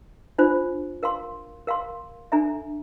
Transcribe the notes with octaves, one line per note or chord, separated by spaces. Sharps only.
D4 F4 C5
A#4 F5 C6
A#4 F5 C6
D4 A4 E5 A#5